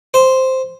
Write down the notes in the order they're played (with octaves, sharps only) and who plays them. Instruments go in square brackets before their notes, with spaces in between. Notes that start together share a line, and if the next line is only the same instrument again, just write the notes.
[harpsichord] C5